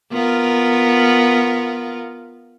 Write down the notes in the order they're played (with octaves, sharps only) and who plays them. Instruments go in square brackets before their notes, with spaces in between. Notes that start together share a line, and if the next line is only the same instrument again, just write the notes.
[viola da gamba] B3 F4 A#4